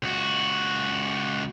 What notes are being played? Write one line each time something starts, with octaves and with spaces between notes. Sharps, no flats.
C#2 F#4